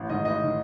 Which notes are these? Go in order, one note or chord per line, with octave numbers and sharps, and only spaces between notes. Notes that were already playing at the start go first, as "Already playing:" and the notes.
Already playing: A1
G#2 D#3 D#5
A1 D#5
D#3